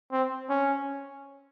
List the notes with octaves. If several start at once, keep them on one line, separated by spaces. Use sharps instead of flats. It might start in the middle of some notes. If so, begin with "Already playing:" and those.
C4
C#4